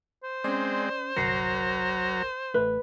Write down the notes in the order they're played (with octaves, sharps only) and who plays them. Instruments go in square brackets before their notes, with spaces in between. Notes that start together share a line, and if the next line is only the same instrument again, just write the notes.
[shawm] C5
[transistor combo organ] G#3 C4 [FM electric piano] C#4 D5
[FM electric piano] G1 C2 A#4 [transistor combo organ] F#3 A#5 [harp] A#6 C7 C#7
[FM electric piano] A1 A3 [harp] B4